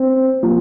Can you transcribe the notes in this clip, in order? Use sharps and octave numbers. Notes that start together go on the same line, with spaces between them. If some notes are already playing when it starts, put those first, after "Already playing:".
Already playing: C4
F3 A#3